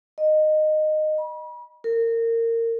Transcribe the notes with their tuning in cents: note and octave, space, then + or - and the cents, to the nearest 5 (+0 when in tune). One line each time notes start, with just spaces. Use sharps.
D#5 -15
B5 -40
A#4 -25